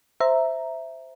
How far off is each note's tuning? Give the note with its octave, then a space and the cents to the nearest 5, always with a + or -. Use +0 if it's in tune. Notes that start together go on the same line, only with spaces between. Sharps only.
C5 -5 E5 +0 A#5 +0